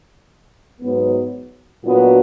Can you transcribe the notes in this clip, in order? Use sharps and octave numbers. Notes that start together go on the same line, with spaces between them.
G#2 F#3 B3
A#2 F#3 B3 D4 F#4